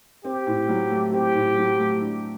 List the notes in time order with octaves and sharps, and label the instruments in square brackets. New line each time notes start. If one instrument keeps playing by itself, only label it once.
[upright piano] C4 [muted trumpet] G4
[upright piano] A2
F#3
A3
[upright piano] C4 [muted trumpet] G4
[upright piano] A2
F#3
A3
D4